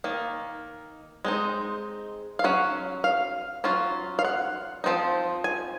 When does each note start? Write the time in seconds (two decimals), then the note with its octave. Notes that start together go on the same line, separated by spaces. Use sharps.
0.04 D#3 A#3
1.25 G#3 C4 D#4
2.39 F5
2.44 F#3 C#4 F#5
3.04 F5
3.64 F#3 C#4 F4
4.19 F5
4.25 F#5
4.84 F3 C4 D#4
5.44 G#5